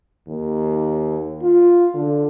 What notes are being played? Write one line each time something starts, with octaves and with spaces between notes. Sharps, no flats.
D#2
F4
D3